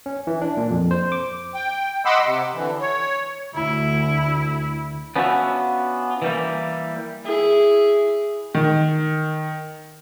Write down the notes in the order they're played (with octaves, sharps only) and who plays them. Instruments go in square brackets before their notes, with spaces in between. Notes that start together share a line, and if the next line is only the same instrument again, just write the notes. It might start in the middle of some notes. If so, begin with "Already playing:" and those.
[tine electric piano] C#4
E3
D4
A#2
F2
C5
D6
[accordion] G5
D#5 F#5 B5 C6 D6 E6
C3
D3 E3
C#5
[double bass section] D2 [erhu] E4
[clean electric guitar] B3 C#4 D4 F4 F#4 E5
E3 G3 A#3
[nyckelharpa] E4 G#4
[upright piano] D#3